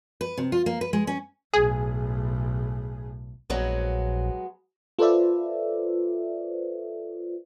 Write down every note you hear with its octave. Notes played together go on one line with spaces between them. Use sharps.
B4
C3
F4
A#3
B4
G#3
C#4
B1 A2 G#4
A#1 F#3 G#3 B3
F4 A4 B4 C5 D5 E5